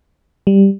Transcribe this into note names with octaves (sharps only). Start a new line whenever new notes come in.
G3